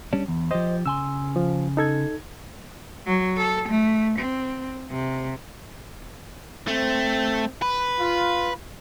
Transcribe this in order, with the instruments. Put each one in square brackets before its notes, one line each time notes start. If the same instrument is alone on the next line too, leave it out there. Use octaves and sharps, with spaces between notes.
[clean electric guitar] G3 C#4 D4
E2
[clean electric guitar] F3 G4 [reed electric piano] C5 D#5
[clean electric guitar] C#3 G#5 C6 [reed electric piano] E6
[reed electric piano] F3
D#4 A4 G#6
[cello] F#3
A4
A3
C4
C3
[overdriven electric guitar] A3 [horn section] C4
[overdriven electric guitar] B4
[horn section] F4